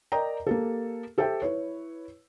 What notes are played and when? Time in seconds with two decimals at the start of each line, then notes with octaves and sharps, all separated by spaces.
0.12 A#4 D5 D#5 G5 A#5
0.47 A#3 G4 A4
1.18 G4 A4 C5 E5 G5
1.42 E4 B4 C#5